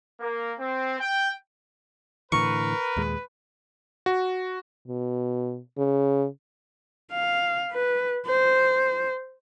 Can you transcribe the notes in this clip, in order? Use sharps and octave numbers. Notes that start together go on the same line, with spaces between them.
A#3
C4
G5
A2 D3 E3 A#4 B4 C#6
D#2 A#2 G#3
F#4
B2
C#3
F5
B4
C5